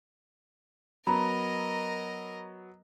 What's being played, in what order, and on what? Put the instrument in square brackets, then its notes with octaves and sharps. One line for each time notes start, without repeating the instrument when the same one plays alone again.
[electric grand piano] F#3 B3 [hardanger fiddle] A#4 D#5 [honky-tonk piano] A#5 [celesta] B5